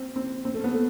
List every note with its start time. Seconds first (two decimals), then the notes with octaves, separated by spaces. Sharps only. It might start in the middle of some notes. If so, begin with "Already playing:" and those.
Already playing: C4
0.16 C4
0.45 C4
0.54 A3
0.64 B3
0.74 A3